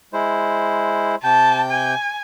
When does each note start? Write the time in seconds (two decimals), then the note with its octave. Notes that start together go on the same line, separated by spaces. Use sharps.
0.13 G#3 E4 C5
1.24 C3 G5 A5 G6
1.71 G#5